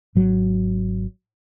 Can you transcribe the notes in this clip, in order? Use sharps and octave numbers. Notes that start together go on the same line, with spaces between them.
G#1 F#3